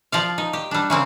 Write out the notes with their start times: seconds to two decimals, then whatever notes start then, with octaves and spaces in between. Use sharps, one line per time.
0.12 F3 D5 F5
0.38 D#4
0.53 G4
0.71 G3 D4
0.90 C#3 A#3 C4